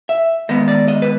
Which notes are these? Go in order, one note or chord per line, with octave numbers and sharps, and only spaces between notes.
E5
D#3 G#3 B3 D#5
D5
D#5
B4